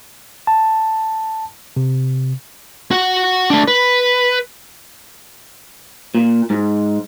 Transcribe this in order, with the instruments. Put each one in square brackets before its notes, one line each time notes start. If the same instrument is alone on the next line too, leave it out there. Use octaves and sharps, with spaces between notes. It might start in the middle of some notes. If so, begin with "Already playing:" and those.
[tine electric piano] A5
C3
[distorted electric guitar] F#4 F#5
A3 D4
B4
[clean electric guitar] A#2
G#2